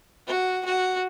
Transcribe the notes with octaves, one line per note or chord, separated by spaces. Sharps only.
F#4
F#4